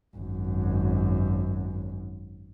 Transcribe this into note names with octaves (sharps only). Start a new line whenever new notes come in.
G#1 F#2